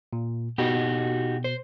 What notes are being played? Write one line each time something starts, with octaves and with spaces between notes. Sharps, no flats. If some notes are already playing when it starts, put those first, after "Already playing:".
A#2
B2 D#4 F#4 G4
C5